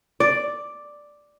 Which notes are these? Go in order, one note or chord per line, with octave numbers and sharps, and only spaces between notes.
D5